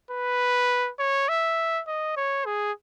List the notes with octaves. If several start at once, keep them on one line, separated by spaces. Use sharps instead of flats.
B4
C#5
E5
D#5
C#5
G#4